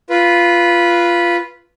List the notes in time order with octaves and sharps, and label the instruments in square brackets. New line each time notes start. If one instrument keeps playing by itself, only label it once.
[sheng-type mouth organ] F4 B4